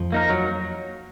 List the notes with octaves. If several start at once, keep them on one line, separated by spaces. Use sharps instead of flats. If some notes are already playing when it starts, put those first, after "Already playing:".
Already playing: F2 F3
A#3 D#4 A#4
F#3